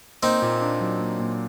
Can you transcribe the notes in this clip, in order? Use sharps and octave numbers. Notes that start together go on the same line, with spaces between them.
A#3 C4 D#4
A#2
D4
F#3
A#3
A#2